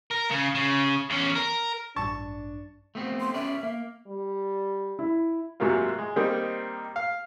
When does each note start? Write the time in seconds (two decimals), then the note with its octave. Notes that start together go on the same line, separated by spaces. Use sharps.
0.11 A#4
0.31 C#3
0.55 C#3
1.10 E2 C#4
1.36 A#4
1.96 A1 G2 D4 A5 C#6
2.95 A3 B3 C4
3.20 C6
3.34 C#4 B4 D5 E5
3.63 A#3
4.07 G3
4.99 E4
5.60 G#2 C3 F#3 A#3 F4
5.98 G#3
6.16 D#3 G3 A#3 C4 D#4
6.96 F5